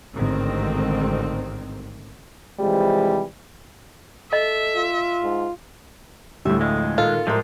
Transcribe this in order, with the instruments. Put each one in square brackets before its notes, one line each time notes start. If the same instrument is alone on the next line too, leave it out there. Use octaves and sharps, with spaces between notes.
[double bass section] A1 G#2 D3 D#3 C4
[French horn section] C3 E3 F3 G3 G#3
[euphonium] A4 [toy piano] D#5 [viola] E5
[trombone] F4
[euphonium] G#2
[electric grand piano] D2 A2 [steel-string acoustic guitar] G3 E5
[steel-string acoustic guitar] F2 [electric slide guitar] G#3
[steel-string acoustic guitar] A#2 D#3 [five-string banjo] F4 [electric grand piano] A4
[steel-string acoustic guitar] A2 A#4 [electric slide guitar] F3 G3 G#3